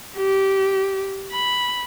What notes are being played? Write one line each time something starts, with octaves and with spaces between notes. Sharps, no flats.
G4
B5